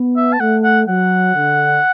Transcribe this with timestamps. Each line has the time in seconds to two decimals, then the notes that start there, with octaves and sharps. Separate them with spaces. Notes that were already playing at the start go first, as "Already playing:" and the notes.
Already playing: B3
0.17 E5
0.33 A5
0.40 A3 F#5
0.64 F#5
0.87 F#3 F#5
1.35 D3